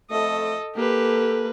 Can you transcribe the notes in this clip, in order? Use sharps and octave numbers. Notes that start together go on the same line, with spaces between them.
F2 A3 A4 D#5
A#3 G4 A4 B4